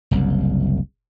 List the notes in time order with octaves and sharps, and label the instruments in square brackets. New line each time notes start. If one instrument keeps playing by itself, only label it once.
[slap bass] F#1 C2